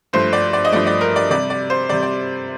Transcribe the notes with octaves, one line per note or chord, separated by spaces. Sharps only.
G2 F3 A3 C5
D5
D5
D#5
G2 F3 A3 D5
D5
A#4
D5
C3 G3 D5
D5
C5
C3 G3 D5
D5